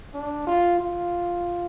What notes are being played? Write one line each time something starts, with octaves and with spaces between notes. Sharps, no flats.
D4
F4
F4